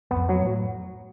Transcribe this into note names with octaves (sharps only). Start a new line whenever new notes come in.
F#2 B3
F2
F#3
A2